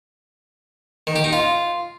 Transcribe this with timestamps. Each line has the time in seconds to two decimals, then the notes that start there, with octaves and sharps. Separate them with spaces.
1.07 D#3
1.16 G4
1.24 D#4
1.33 F4